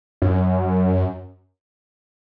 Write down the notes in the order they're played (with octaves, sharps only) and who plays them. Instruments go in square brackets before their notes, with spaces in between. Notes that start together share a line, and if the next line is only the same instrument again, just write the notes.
[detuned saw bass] F#2